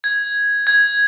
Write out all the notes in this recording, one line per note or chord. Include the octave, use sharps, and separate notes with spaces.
G#6
G#6